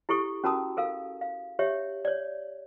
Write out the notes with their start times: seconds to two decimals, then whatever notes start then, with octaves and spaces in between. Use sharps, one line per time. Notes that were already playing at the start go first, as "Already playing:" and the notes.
0.09 E4 G4 A4 C#6
0.44 C#4 F#4 A#4 A5 A#5 D#6
0.77 A4 A#4 F5
1.21 F5
1.59 G4 C#5 E5
2.05 C#5 D5